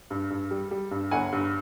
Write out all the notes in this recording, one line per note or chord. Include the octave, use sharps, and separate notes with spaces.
G2
G2
G3
G3
G2
G1 F#5 G#5
G2